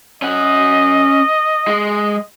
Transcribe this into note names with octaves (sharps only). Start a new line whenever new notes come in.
C#4 D#5 F#5
G#3